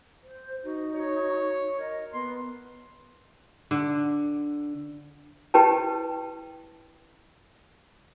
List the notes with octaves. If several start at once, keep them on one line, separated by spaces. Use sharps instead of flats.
C5
D#4 F#4
F#4 C#5
A#4 D#5
B3 C6
D3
E4 G4 B4 G5 A5